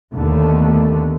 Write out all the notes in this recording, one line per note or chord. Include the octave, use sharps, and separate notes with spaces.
D#2 D3 A3 B3